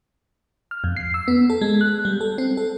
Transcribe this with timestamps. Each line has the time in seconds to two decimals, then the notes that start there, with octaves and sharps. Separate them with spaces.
0.71 F6
0.84 F2
0.96 C7
1.14 E6
1.28 B3
1.50 A4
1.61 G#3
1.81 F#6
2.05 G3
2.21 A4
2.38 C4
2.57 A4